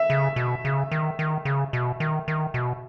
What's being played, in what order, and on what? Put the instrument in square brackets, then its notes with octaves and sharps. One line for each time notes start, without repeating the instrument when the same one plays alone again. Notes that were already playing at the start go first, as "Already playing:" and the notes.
Already playing: [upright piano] E5
[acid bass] C#3
B2
C#3
D#3
D#3
C#3
B2
D#3
D#3
B2